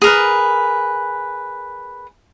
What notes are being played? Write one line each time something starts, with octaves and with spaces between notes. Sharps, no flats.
G#4 A#4 B4